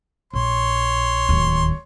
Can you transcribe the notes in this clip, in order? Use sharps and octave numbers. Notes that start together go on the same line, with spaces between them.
A#1 C#5 C6
D1 D#2